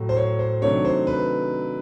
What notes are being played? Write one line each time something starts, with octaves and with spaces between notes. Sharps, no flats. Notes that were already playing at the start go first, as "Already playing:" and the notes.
Already playing: A2 F#3 A3
C5
C#5
C5
C3 D#3 F#3 A3 D4 C#5
C5
B4